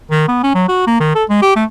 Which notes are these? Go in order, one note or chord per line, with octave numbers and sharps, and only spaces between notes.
D#3
B3
C#4
F#3
F#4
A#3
D#3
A4
G#3
G4
A3